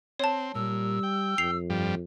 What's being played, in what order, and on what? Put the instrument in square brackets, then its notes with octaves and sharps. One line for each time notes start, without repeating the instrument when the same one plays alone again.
[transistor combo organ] C4 [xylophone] C#5 A5
[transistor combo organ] A#2 [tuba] G3 [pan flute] E6
[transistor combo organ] G5
[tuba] F2 [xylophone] C7 F7
[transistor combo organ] G2 F3 G3